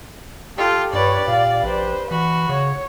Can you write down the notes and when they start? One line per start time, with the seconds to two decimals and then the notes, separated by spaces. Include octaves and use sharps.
0.58 F4 G4 A4 G5
0.93 G2 B4 C#5 D5
1.28 A#2 F5
1.63 A#1 B4 C5
2.11 E3 F#4 B5
2.49 C#3 C#5